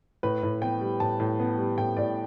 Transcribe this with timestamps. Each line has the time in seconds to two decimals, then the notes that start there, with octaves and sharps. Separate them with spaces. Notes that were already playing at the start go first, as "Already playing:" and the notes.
0.23 A2 B4
0.43 A2
0.62 B3 G5
0.81 G3
1.00 A2 A5
1.20 A2
1.40 B3
1.58 G3
1.78 A2 G5
1.97 A2 D5